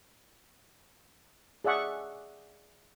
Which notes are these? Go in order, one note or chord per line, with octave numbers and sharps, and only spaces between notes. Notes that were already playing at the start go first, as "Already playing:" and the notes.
G#4 D5 E5 F#5 C#6